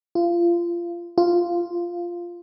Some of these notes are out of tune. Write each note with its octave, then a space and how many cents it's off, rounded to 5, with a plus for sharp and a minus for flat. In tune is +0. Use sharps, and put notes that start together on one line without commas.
F4 -25
F4 -5